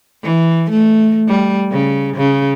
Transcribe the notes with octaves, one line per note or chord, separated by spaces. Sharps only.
E3
A3
G3
C#3
C#3